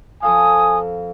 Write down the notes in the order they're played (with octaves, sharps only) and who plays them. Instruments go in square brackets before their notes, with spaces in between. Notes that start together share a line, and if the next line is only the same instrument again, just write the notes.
[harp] F2 A4 F5 [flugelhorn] G#5 [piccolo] D#6